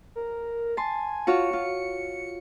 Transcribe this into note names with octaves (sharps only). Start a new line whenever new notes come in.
A#4
G#5 A5 C6
F4 F#4 C#5 C#7
F4